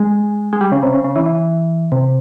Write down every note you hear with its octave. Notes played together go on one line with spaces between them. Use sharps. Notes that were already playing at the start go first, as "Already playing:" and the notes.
Already playing: G#3
G#3
G3
C#3
C3
C#3
C#3
E3
E3
C3